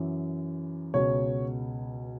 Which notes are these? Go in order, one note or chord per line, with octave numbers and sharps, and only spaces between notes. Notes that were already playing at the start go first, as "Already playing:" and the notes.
Already playing: F#2 E3
C#2 B2 C#5